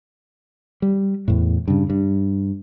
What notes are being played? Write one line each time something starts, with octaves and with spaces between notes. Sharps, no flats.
G3
E2 A2
G2 C#3
G2